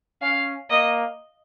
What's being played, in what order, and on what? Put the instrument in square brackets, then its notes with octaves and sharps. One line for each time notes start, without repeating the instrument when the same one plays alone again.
[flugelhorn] C#4 [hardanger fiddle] F5
[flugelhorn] A#3 [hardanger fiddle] D#5